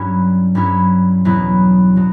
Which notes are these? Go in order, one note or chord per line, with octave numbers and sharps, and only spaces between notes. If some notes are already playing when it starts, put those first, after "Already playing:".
Already playing: G2 F#3 C#4 E4
G2 F#3 C#4 E4
E2 B2 F#3 B3 E4
B2 F#3